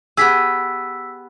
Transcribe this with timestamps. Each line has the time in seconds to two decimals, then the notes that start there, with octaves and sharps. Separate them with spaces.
0.17 B3 G4 G#4 E6 B6